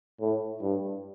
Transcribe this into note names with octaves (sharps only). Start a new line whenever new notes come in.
A2
G2